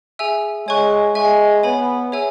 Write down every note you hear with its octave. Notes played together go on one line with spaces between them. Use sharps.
G#4 E5 G#5 E6
G#3 C#5 G#5 C#6 F#6
G#3 E5 G#5 C#6
B3 C#5 G#5 B5
G#4 C#5 E5 G#5 E6